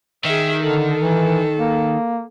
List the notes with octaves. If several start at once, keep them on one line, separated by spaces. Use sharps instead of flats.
D#3 G#4 E5
D3 A4
E3
A#3